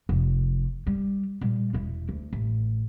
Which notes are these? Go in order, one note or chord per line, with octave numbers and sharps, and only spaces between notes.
F1
G3
A#2 G3
E1 E4
D2
A1